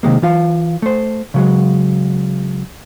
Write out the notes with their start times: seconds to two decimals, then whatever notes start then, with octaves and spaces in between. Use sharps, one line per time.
0.03 C3 D#3 G#3 A#3
0.22 E3 F4 F5
0.82 A3 C5
1.34 C#3 F#3 G#3